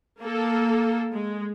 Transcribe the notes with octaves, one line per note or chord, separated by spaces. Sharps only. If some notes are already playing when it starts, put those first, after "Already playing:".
A#3 A4
G#3